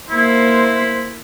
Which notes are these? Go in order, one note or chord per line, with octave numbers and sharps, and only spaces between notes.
A#3 E4 C5